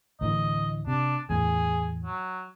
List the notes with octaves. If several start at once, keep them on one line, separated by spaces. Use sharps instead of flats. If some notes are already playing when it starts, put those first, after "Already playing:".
D2 A2 E3 D#5
C3 D4
E2 A2 G#4
F#3